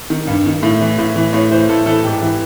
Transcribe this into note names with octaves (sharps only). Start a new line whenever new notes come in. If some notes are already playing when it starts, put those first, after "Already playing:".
D#3
G2
D#3
A2
E3
A2
E3
A2 C#5
E3 C5
A2 A4
E3 A4
G#2 G4
E3